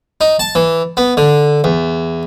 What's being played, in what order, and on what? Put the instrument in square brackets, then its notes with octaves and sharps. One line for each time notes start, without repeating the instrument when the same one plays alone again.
[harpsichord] D#4
A5
E3
B3
D3
E2